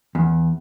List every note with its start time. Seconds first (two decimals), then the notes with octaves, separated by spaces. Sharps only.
0.15 E2